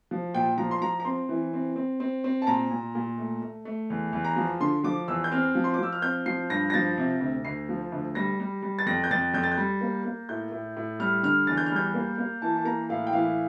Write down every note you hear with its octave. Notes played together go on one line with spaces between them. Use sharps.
F3
A#2 G5
F3 A#5
C6
F3 A#5
A#5
C4 C6
E3
C4
C4
C4
C4
A5
A#2 A#5
A#2
A#2
A3
A3
A3
E2
E2
A#5
F3
D3 C6
F3 D6
E2 E6
G6
C4 F6
F3
C6
D6
F3 E6
F6
C4 G6
F3 C7
G2 A#6
A#6
F3 A6
C3
D2
D2 C7
F3
D2
G3 A#6
G3
G3
A6
F2 A#6
G6
F2 A6
F2 G6
A6
G6
G3
A#3
A#3
A2 G6
A2
A2
G3 F6
D3 F6
E2 A6
G6
F6
G3 G6
A#3
A#3
E3 A5
A5
A#3 A#5
A2 F5
G5
E3 F5